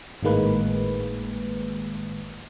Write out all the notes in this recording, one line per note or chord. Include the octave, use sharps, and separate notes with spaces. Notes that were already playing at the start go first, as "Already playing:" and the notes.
G#1 A2 D#3 G#3 A#3 B4